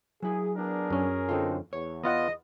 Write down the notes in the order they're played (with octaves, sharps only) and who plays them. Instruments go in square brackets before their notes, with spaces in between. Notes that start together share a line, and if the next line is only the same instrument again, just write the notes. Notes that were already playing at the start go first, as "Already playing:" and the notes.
[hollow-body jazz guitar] F#3 E4 [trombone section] G#4
[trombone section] B3 D4 [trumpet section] G#4 A#4
[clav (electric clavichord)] F#2 C#4
[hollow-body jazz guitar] D3 F4 [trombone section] C4 D#4 A4
[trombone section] E2 [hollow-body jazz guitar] C#5
[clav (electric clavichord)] B3 F4 F#5 [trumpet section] D#5